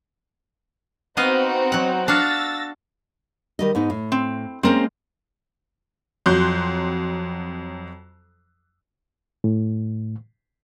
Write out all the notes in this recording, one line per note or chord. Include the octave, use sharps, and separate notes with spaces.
B3 C4 D#4 F#4 D#5 F5
F#3 F#5
D4 F#4 F5 E6 A6 A#6
D#3 G3 D#5
G#2 B3 D#4
A2
C4
G#3 A#3 C4 C#4 A#4 C5
F2 F#3 C6 F#6 G6
A2